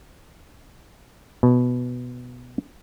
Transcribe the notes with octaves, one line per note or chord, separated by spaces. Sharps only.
B2